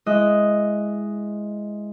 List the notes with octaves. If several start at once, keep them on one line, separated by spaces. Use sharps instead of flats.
G#3 E4 D#5 E6 F#6